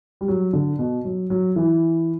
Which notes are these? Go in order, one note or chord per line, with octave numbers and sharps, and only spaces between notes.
G3
F#3
D3
B2
F#3
F#3
E3